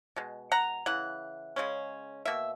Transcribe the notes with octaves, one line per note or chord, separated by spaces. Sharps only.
B2 G#3
F#5 A#5
C#3 E3 F#5
C#3 G#3 C#4
B2 A#3 E5